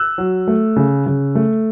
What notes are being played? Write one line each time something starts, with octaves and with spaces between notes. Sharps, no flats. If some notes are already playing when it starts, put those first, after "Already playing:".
Already playing: E6 F#6
F#3
A3
C#3
C#3
A3